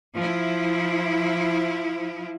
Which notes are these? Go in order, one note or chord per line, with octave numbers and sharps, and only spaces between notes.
F3 E4